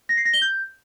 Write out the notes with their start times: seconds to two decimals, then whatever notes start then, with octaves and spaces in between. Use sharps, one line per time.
0.09 A#6
0.17 C7
0.25 A#6
0.34 G7
0.42 G6